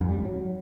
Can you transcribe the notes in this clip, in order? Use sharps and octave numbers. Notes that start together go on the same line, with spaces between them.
F2
G3
G#2
F#3